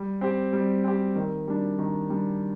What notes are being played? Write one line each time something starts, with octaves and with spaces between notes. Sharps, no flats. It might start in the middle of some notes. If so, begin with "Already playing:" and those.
Already playing: G3
C4 G4
G3
C4 G4
D#3
G3 D4
D#3
G3 D4